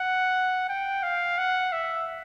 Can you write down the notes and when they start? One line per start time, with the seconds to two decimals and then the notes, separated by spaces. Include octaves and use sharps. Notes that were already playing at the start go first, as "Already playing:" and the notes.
Already playing: F#5
0.69 G5
1.03 F5
1.38 F#5
1.72 E5